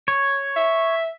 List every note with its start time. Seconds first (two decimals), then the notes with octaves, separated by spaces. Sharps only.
0.08 C#5
0.56 E5